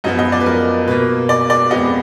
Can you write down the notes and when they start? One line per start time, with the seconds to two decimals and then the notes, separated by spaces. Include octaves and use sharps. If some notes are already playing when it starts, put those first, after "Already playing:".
0.04 F#2 F3 B3 D#5
0.19 D#5
0.32 D5
0.40 B4
0.46 A#4
0.87 B2 A#3 B4
1.29 D5
1.50 D5
1.70 F2 F3 G#3 B3 D#5